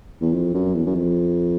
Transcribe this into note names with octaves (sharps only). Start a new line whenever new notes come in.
E2
F2
F#2
E2
F#2
F2